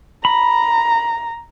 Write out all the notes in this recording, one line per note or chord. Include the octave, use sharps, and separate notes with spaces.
A#5 B5